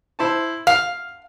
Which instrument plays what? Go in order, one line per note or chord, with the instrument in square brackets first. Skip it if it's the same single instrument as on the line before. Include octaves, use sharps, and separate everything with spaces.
[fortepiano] E4 C5 A5
[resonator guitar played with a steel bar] F5 [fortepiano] F6